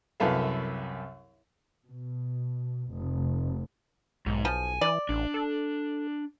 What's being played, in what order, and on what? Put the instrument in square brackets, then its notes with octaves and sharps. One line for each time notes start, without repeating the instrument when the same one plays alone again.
[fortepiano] C2 F#2 A4 B4 E5 F5
[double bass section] B2
F1
[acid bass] B1 [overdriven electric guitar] G#2
[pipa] F3 [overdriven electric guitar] G#5
[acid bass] E3 [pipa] D5
[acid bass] A1 [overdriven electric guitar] D4
[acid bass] A4